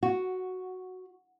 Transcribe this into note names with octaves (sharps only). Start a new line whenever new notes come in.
F#4